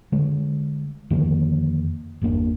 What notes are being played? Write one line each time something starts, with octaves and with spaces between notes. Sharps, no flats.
D3 G#3
F2 D3 D#3 A#3
G1 E2 A#3 D4